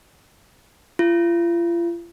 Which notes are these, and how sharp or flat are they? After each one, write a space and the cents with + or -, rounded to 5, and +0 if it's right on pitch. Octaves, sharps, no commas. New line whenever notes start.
F4 -40